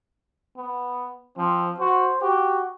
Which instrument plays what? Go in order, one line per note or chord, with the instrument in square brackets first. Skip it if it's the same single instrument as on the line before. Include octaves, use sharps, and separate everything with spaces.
[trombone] B3
[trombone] F3 [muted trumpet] C4
[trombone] F#4 [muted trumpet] C5
[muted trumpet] F#4 [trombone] G4